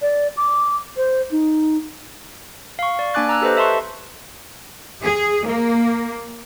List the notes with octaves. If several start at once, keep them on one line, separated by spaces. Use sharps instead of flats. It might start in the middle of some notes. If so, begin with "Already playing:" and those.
D5
D6
C5
D#4
F5 C#6
D5
A#3 D4 G#5 D6 F#6 A6
A#5 E6 F#6
G4 A4 B4 C5 D#5
E5 A5 C6 C#6
G#4
A#3